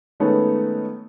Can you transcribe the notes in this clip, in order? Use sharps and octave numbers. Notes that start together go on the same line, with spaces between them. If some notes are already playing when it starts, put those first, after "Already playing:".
D#3 G#3 A3 B3 C#4 D#4